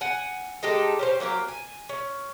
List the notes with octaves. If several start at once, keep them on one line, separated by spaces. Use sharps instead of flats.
F#5 G#5
G#3 D#4 G4 A4
C#4 G4 C5
F#3 A#3 E4 G4
G#5
C#4